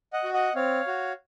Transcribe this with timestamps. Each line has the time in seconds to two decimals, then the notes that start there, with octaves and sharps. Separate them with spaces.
0.13 D#5 F#5
0.24 F#4
0.34 D#5 F#5
0.55 C4 C#5 F5
0.87 F#4